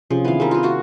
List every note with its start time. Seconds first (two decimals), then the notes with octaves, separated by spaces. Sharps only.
0.10 C3 F3 C#4 G#4
0.24 D#3 B3 E4 F5
0.40 G3 C4 G#4 A#4
0.51 B3 F4
0.63 A#3 F#4